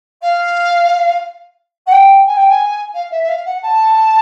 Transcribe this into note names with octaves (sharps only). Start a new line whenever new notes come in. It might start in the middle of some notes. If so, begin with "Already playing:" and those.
F5
F#5
G5
G#5
G5
G#5
F5
E5
E5
F5
F#5
A5